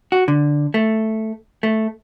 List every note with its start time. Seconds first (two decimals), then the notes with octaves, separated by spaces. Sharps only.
0.12 F#4
0.28 D3
0.74 A3
1.63 A3